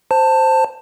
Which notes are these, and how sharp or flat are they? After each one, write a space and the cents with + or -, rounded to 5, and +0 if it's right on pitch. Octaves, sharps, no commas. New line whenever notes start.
C5 +0 A5 +15